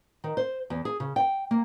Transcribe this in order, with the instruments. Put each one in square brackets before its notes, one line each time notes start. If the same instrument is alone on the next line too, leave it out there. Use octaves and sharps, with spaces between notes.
[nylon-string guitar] D#3
C5
E2
G#4
C#3
G5
A#3